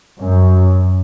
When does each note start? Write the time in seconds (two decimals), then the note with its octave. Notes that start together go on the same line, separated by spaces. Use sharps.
0.20 F#2